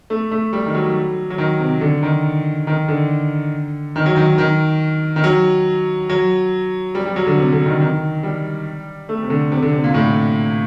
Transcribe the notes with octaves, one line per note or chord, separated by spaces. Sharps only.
A3
A3
G3
D#3
F#3
F#3
D#3
C3
D3
D#3
D#3
D3
D#3
F#3
D#3
D#3
D#3
F#3
F#3
G3
G3
F#3
D3
C3
D3
D#3
D#3
G3
A3
C3
D3
C3
D3
C3
A#2
A2